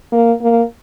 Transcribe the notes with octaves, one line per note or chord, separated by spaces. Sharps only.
A#3
A#3